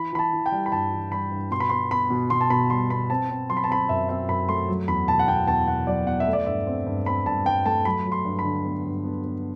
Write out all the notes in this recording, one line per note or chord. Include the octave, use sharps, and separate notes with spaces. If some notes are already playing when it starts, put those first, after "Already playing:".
Already playing: E3 B5
E3 B5
A5
E3
G5
G3
B5
G2 A5
E3
G3 B5
G2
B2 C6
B5
B3 C6
B3 B5
B2
B2 C6
A5
B2 B5
G3 C6
B3 B5
C4 A5
C4
F#3 C6
B5
A5
C4 B5
F#2 E5
C4 E5
F#2 B5
A3 C6
F#3
E2 B5
B2 A5
F#5
E2 G5
E2 A5
B2 F#5
F#3 D5
B2 F#5
E5
A3
D5
G2 E5
C4
G2
C4 B5
G2 A5
G2 G5
A3 A5
F#3 B5
F#3
C6
G2
B5
D3
B3
G2
B3
B3